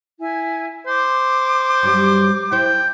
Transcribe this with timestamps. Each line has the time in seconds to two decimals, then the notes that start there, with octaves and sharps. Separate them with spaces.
0.20 E4 G#5
0.87 C5 D6
1.83 G2 F#3 G3
2.52 E4 C5 G5